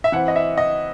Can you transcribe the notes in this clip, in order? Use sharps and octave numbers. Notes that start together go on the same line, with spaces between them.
E5
E3 C4 F#5
D#5
E5
D#5